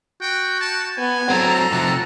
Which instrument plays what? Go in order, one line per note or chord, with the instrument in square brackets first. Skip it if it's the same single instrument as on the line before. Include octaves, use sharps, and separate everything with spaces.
[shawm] F#4 [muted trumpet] G5
[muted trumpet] A5
[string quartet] B3 [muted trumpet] G#5
[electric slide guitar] F#3 C4 [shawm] A4 [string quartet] A#5
[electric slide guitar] C3 F3 [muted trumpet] F#4